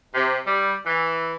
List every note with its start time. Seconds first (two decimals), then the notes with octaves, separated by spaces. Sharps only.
0.15 C3
0.46 G3
0.86 E3